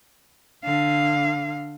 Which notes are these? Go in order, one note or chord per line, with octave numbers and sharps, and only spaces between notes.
D3 F5